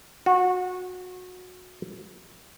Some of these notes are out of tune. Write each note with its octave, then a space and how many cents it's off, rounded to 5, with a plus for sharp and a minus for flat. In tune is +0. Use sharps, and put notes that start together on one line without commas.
F#4 -25